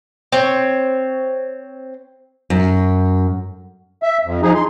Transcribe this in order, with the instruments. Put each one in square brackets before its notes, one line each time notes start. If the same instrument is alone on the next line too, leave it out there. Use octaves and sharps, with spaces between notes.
[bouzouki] C4 C#5
[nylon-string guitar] F#2
[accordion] E5
F2
F3 D#4 G#4
C6